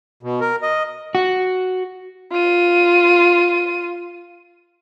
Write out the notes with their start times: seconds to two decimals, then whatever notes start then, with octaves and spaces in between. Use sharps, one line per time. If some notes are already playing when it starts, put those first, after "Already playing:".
0.23 B2
0.41 A#4
0.63 D#5
1.15 F#4
2.32 F4 D#7